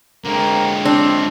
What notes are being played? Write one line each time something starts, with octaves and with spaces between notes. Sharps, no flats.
D3 F#3 G#3 A#3 C4 G4
C#5 F5 G5
C4 D4 B4 C#5